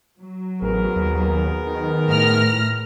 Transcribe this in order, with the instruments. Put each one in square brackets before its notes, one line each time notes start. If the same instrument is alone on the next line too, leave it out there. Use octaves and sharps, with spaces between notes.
[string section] F#3
[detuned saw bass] A1 [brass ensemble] B3 G#4 A#4
[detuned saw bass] D#2
D#3
[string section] A2 F6 A#6